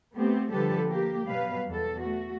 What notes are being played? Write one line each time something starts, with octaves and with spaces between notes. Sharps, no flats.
A3 B3 C4 G4
D3 F3 G3 G4 A4 B4
A#3 G4
B2 F#3 G3 B4 F5
E2 A4
A3 F#4